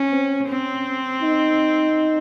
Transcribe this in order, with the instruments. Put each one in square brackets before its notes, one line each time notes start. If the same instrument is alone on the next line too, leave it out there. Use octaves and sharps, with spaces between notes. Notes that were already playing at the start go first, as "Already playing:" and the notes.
Already playing: [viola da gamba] C#4
[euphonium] C4
[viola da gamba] C4 [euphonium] C#4
[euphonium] D#4